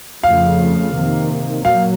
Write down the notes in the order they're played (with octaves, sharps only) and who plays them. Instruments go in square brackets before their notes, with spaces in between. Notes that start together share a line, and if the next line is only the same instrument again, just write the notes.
[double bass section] F2 C#3 F3 A3 [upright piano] F5
[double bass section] C3 D#3 A#3
[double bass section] A#2 F#3 A#3 [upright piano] F5